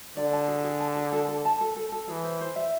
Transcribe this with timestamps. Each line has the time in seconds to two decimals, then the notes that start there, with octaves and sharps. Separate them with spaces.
0.17 D3 D5
0.33 A5
0.48 G#4
0.64 G#4
0.80 A5
0.96 G#4
1.13 A4
1.28 A4
1.45 A5
1.61 A4
1.76 A4
1.92 A4
2.08 E3 G#4
2.24 C5
2.41 C5
2.56 E5